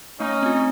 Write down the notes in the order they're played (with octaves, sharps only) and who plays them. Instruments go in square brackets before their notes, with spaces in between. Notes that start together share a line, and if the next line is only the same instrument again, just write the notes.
[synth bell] A3 [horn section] C#4 D#4
[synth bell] C4 F4